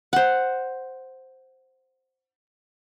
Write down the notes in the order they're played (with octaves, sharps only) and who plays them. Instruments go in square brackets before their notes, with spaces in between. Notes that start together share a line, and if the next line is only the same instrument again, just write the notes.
[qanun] C5 F#5